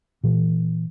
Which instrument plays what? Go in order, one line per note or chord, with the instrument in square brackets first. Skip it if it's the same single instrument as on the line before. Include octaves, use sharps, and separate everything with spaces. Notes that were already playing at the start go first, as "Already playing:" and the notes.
[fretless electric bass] A#2 E3